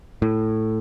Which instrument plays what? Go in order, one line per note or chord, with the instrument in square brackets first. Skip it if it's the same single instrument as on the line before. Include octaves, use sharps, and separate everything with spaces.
[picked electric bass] A2